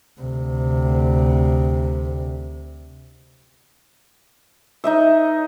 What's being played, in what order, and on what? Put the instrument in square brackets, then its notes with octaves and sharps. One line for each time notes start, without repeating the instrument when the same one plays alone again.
[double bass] D2 C3
[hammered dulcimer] D#4 D#5 E5